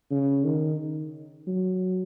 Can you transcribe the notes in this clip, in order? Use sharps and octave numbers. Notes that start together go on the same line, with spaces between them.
C#3
D#3
F#3